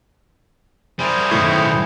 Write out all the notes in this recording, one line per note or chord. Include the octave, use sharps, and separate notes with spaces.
G3 E4 G#4 A#4 C5
B1 A2 D#3